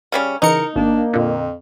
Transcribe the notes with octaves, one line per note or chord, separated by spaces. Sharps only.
C#3 G3 C#4
C#3 E3 D#4 A#4 C#7
G#1 A#3 D4
F2 A#2 D3